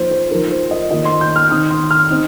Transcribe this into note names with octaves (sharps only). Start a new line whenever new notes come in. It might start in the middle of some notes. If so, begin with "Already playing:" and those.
Already playing: F3 A#3 D#4 C5
C5
F3 D#4 A#4
C5
D#5
D#3 A#3 F4 D#5
C6
G6
F6
D#3 C4 D#4 D#6
C6
F6
C4 D#4